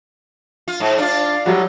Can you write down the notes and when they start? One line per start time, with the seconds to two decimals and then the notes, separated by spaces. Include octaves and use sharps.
0.68 F4
0.80 G#2
0.98 D4 F4 D5 F5
1.46 A2 F#3 G3 F#4